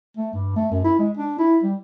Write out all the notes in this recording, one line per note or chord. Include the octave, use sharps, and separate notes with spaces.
A3
G2
A3
F#2
E4
G#3
D4
E4
G3